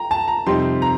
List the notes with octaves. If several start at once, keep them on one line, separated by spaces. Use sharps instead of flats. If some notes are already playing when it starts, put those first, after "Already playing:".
Already playing: G5 A#5
A5
A#5
F2 C3 G3 C4 D#4 C6
A#5